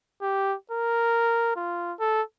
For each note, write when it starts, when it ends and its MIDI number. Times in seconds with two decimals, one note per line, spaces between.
0.22 0.55 67
0.71 1.54 70
1.56 1.93 65
2.00 2.22 69